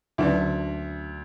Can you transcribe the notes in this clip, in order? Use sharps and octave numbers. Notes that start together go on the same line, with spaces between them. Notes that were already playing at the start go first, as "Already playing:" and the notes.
D2 D3 F#3 C#4 F#4 B4 D5